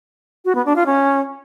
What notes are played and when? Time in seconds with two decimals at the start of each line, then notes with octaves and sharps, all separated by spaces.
0.45 F#4
0.55 B3
0.66 D4
0.76 F4
0.86 C#4